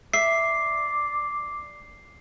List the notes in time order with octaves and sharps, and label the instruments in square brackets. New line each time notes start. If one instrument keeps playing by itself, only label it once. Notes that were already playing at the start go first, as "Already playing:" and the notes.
[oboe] D5 [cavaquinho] E5 [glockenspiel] C7